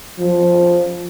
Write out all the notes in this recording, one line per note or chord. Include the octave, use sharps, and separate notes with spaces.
F3